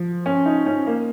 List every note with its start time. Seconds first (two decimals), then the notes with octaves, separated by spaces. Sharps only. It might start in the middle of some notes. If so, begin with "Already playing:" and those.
Already playing: F3
0.26 C#4
0.46 D#4
0.66 C#4
0.87 A#3